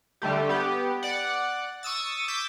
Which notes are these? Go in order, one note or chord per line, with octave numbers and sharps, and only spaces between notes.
D3 G3 A3 G4
B3 G4
D5 F#5
C#6 D#6 E6 A6
D6 E6 G6 B6